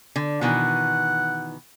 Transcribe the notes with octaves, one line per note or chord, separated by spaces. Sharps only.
D3
B2 D#3 E3 F#5